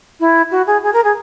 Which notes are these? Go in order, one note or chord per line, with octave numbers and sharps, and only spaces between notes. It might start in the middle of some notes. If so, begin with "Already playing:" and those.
E4
F#4
G#4
G#4
A#4
G#4